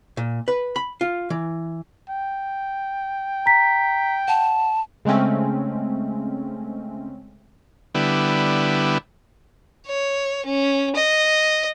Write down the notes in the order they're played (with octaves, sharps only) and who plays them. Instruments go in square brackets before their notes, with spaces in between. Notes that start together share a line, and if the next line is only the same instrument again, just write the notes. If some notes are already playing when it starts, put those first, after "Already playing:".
[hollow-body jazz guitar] A#2
B4
B5
F4
E3
[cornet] G5
[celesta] A#5 B6
[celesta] F#5 [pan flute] A5
[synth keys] C#3 G#3 A3 C4 C#4
[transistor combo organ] D3 G3 B3 E4
[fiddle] C#5
C#4
D#5